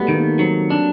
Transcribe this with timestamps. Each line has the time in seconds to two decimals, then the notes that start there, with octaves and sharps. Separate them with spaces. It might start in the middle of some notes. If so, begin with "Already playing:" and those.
Already playing: F#3 G3 A3 B3
0.08 D#3
0.15 A#3
0.39 F#3 C4
0.70 D4